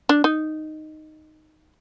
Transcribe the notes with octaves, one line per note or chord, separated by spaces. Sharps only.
D4
D#4